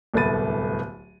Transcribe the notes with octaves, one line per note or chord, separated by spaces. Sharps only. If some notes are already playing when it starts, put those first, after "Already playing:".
D1 C2 A3 B3 A6 D#7